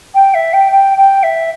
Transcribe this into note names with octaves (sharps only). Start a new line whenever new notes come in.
G5
E5
G5
G5
G5
E5